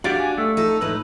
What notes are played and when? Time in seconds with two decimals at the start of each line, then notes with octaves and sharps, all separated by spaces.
0.04 D4 F#4 G4 D5 F5
0.19 G#5
0.38 A3 E6
0.57 D#4 A4
0.81 A2 G#3 D#4 B4